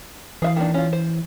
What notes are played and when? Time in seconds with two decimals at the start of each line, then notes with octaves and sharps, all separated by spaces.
0.42 E3 G#4 E5 F5
0.56 D#3 A#3 D4
0.74 C#4 F4
0.93 C5